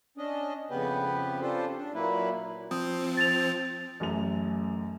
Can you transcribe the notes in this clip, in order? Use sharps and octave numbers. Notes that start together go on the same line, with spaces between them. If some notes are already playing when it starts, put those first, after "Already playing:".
C#4 D4 D#5
F2 C#3 B3 G4 B4
C#4 D4 F4 G4 A4 C5
D4
A#2 F#3 A#3 E4 B4
F3 C4 D#6
A6 F7
A1 F#2 A3 F7